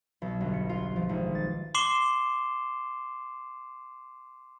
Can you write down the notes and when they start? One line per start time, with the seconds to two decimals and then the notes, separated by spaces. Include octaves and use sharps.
0.22 B1
0.41 G1
0.53 C#7
0.69 F4
0.96 F3
1.09 G#1
1.35 A6
1.75 C6 D6 C7 E7 G7